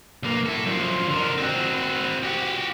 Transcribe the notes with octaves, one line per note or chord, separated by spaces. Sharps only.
B1 A#3
E4 A4
F#2 F3
D3 A#4
C4 F#4
F#4 G4